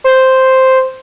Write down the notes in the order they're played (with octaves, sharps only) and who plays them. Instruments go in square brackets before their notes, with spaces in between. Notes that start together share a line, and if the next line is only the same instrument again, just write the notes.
[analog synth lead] C5